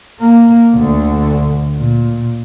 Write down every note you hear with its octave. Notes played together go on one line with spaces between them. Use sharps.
A#3
D2 D3
A#2